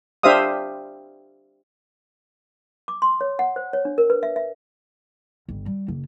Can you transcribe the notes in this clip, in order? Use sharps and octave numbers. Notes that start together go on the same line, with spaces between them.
D4 G4 C5 E5 F5 D#6
D6
C6
C#5
F#5
C5
C#5
D4
A#4
B4
E5
E5
G1
G3
F#1